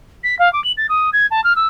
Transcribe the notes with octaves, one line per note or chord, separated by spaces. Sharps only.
B6
F5
D6
F#7
A6
D#6
G#6
A5
F6
E6